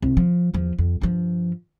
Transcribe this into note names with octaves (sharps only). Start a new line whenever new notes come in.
C2
F3
E2 F3
F2
G2 F3